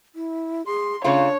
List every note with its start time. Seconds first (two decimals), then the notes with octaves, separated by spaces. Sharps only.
0.15 E4
0.66 G#4 C6
1.04 C#3 A3 D4 F4 C#5